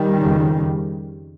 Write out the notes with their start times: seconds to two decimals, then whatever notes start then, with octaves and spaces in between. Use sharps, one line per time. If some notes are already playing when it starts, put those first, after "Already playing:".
Already playing: D#3 G3
0.18 F2 C#3